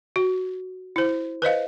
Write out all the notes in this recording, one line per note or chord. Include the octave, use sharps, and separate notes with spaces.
F#4
E4 C5
B4 C5 D#5 F5